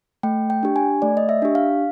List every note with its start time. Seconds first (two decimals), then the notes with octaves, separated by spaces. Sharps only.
0.23 A3 G5
0.50 G5
0.63 D4 G4
0.76 G#5
1.02 A3 D5
1.17 D#5
1.29 E5
1.42 D4 G4
1.55 F5